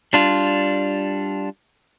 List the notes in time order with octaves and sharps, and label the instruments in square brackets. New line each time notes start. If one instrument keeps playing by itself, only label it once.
[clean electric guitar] G3 D4 F4